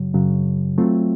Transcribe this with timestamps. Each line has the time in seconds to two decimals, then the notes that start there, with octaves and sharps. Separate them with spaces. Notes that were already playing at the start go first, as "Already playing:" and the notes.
Already playing: F#2 C#3 F#3
0.14 F#2 C#3 F#3
0.78 F#3 A3 C4 F4